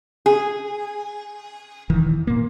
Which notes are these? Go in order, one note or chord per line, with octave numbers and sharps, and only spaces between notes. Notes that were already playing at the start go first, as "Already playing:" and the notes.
G#4
E1 D#3 E3
A#2 A#3